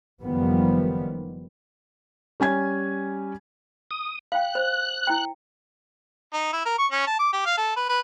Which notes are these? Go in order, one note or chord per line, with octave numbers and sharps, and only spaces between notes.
F#1 D#3 F3 G3 B3
G3 C#4 G#5 G#6
D#6
F5 G5 F#6
C5
E4 G5
D#4
E4
A#4
C#6
C#4
A5
D6
G4
F5
A4
B4
B4